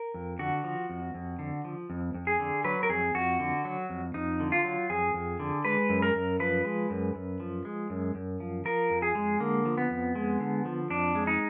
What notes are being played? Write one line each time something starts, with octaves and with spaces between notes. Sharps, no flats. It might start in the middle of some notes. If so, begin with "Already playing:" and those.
Already playing: A#4
F2
D3 F#4
F3
F2
F2
D3
F3
F2
F2
G#4
D3
F#3 B4
A#4
F2 G#4
F2 F#4
D3
F#3
F2
F2 D#4
D3
F4
F#3
F2 G#4
F2
D3
G#3 B4
F#2
A#4
F#2
F3 B4
G#3
F#2
F#2
F3
G#3
F#2
F#2
F3
F3 A#4
F2
G#4
G#3
D3 A#3
F3
B3
F2
G#3
D3
F3
F2 D4
G#3
D#4